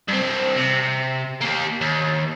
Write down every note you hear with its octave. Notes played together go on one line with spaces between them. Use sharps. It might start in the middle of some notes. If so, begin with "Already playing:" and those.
G2 C4
C3
A#3 G4
D#2